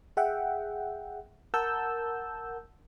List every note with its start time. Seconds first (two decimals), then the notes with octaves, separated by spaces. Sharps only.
0.17 G#4 E5 F#5 G5
1.54 A#4 F#5 A5 E6 G6